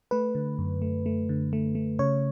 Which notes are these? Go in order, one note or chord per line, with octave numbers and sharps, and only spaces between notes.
A3 B4
D3
F#2
A3
A3
D3
A3
A3
C#3 C#5